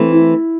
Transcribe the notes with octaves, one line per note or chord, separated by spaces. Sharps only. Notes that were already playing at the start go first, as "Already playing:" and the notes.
Already playing: E3 A3 C4
E4